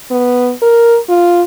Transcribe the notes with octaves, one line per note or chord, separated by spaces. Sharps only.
B3
A#4
F4